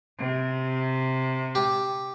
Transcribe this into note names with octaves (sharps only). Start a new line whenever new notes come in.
C3
G4